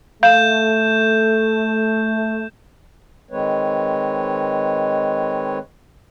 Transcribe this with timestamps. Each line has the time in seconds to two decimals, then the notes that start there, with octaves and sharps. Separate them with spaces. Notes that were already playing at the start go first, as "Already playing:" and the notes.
0.23 A3 F5 G6 E7
3.31 D#3 G#3 C4 B4 C#5